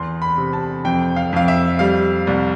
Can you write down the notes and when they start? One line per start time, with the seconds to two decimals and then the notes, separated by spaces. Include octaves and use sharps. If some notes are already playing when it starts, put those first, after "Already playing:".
Already playing: E2 C6
0.22 B5
0.38 C3
0.53 A5
0.85 F2 G5
1.16 F5
1.33 F2 F5
1.48 E5
1.79 G3 F5
2.27 C2